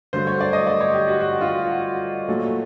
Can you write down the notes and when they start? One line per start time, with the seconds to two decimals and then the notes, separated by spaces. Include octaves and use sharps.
0.13 G2 D3 F#3 A3 C5
0.27 C#5
0.41 D5
0.53 D#5
0.67 D5
0.81 C#5
0.94 G4
1.08 F#4
1.21 F#4
1.41 F4
1.47 F#4
2.28 A#2 F#3 A3